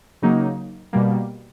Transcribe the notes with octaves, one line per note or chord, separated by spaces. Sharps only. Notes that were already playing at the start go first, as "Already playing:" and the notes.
C#3 F#3 A#3 D#4
B2 G3 A#3